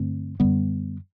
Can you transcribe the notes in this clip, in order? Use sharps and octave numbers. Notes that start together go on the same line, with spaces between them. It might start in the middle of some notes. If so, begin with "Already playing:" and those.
Already playing: G2 D3 A3 C4
F#2 D3 G3 B3